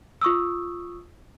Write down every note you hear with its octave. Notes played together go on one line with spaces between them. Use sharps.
F4 C#6 D#6 E6